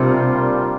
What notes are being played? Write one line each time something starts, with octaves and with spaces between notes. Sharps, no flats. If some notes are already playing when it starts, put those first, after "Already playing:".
Already playing: C3 G3 A#3 D4 F4 A#4